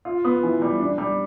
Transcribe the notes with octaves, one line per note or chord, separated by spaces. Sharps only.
F4
B3
E3
G3
D4
G3